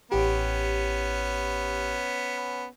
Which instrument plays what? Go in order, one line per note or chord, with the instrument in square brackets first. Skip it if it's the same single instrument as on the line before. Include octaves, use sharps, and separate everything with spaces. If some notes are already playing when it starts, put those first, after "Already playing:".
[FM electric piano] A1 G4 [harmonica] B3 C#4